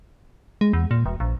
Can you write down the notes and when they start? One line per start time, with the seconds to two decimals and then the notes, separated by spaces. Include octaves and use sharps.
0.61 G#3
0.73 E2
0.91 A#2
1.06 E1
1.20 A#1